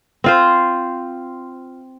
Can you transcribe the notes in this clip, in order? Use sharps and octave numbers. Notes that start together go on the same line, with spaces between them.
C4 F4 C5